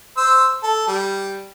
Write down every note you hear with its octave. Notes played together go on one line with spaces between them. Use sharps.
C5 E6
A4
G3